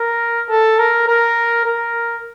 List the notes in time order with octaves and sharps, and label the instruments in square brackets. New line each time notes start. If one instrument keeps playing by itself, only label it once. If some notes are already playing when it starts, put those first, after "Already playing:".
Already playing: [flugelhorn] A#4
A4
A#4
A#4
A#4